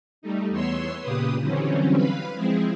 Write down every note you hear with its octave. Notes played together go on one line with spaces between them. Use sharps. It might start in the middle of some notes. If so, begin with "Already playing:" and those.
G3 A3 D#4
E2 B3 C#5 C6 E6
A#2 C#3 G4 B4 D#6
D3 E3 F#3 G3 C4 C#4
B4 F5 B5
F3 G#3 C4 E4 G#4